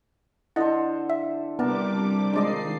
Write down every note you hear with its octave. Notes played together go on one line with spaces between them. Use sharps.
D3 E4 A4 C5 D#5 F#5
E5
C3 G3 B3 D4 A#4 A5 D6
D#3 F3 G#3 D4 D5 D#5 C7